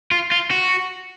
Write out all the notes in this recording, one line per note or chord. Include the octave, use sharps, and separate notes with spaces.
F4
F4
F#4